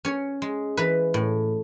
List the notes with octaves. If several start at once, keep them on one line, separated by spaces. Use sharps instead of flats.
C#4 C#5
G#3
E3 B4
A2